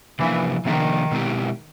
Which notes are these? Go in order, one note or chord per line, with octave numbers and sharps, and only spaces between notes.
C3 E3 F3 A#3 D4
C3 D#3 F3 A#3 D4
B2 G#3 C4 E4 G4